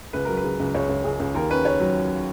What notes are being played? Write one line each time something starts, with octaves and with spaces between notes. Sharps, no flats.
C#2 B4
F#3 A#4
B4
C#3
C#2
C#2 C#5
C#2
C#2 G#4
C#2
D#2 A#4
C#4 B4
C#3 C#5
F#3